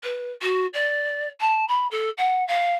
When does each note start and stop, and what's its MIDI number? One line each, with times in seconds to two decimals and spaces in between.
0.03 0.32 71
0.42 0.66 66
0.73 1.27 74
1.40 1.65 81
1.68 1.87 83
1.91 2.10 69
2.18 2.46 78
2.47 2.75 77